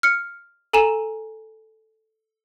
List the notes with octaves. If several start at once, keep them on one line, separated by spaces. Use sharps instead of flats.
F6 C#7
A4 G#5 A#5 E7